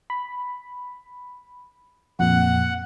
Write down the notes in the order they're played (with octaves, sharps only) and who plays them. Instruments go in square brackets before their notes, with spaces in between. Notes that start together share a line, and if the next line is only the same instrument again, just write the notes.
[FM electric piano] B5
[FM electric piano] F2 A#2 [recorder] F#5